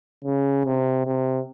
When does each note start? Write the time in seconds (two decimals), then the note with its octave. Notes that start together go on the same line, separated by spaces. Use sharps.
0.24 C#3
0.65 C3
1.06 C3